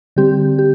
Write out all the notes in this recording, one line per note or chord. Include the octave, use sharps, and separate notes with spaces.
D3 G3 C4 G4
G4